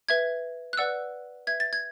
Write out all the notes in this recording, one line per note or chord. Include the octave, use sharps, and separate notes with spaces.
B4 E5 G#6
F#6
B4 D5 F#5 E6
B4 E5 G#6
A6
G#6